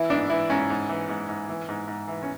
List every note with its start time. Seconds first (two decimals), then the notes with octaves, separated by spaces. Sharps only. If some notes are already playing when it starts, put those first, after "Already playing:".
Already playing: E3 E4
0.10 G#2 D4
0.30 E3 E4
0.50 G#2 C#4
0.70 G#2
0.89 E3
1.09 G#2
1.29 G#2
1.49 E3
1.69 G#2
1.88 G#2
2.08 E3
2.23 C#4